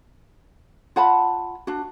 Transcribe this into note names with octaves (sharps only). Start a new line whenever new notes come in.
F4 F#5 A5 B5
D4 F#4